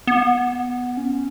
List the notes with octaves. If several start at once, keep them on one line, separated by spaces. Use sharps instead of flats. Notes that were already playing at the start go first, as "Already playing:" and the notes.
B3
C#4